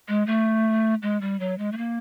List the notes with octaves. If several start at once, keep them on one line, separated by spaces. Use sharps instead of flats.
G#3
A3
G#3
G3
F#3
G#3
A3
A#3